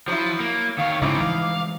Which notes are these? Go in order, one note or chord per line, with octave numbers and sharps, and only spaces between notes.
F3 F#3 E4
A#3
D#3 C#5 F5
G#2 C#3 C4 D#4 E4 D6
E3 F3 G#3 F5